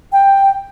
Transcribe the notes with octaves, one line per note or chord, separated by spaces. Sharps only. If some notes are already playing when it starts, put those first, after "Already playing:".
G5